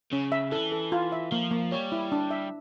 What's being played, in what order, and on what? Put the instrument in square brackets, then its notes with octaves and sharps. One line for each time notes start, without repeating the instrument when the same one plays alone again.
[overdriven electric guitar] C#3 [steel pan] C#4
[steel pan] E5
[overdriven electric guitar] E3 [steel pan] A4
[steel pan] A4
F4
E5
[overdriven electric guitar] F3 [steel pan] A#3
[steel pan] A#3
[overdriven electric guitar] G3 [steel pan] C#5
[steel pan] E4
D4
E5